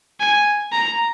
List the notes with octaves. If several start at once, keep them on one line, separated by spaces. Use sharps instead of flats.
G#5
A#5